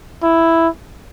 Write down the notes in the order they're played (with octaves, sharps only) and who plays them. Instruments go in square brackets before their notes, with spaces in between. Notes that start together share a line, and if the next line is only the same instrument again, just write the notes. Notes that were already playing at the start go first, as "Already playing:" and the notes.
[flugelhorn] E4